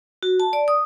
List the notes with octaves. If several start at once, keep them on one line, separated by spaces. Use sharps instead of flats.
F#4
A5
D5
D#6